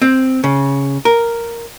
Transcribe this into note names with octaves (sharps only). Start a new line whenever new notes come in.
C4
C#3
A#4